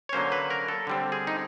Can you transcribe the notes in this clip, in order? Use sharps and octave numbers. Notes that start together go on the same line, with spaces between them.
C#5
D3 F#3 A#3 C#4 C5
B4
A#4
A4
D3 G3 C4
G#4
D#4